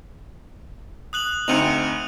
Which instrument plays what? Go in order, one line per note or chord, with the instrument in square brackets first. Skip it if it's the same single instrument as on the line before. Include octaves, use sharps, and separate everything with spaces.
[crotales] D#6 F#6 F#7
[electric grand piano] D2 C4 D#4 [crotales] C#7 D#7 F7